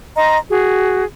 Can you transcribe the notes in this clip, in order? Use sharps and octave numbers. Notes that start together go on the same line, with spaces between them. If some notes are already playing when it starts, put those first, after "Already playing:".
D#5 A#5 C6
F#4 G#4